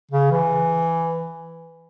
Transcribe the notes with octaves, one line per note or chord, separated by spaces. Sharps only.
C#3
E3